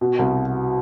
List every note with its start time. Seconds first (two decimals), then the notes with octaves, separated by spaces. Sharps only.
0.01 B2
0.19 C2